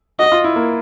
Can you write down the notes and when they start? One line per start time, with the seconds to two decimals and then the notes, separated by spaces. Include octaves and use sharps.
0.19 F#4 D#5
0.32 F4
0.44 E4
0.56 A#3